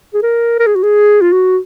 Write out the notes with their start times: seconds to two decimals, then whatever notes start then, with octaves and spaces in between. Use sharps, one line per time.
0.14 G#4
0.23 A#4
0.59 A#4
0.66 G#4
0.75 F#4
0.83 G#4
1.21 F4
1.32 F#4